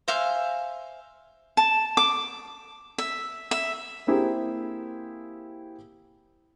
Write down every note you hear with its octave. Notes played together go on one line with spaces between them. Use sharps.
C5 E5 F5 G#5
A5
D6
E5
E5
A#3 C4 E4 G4 G#4